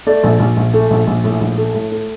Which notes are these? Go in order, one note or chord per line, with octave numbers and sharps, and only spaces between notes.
A3 D5
A#1
A#1
A#1
A3
A#1
A#1
A2
A#1
A3
A2
A3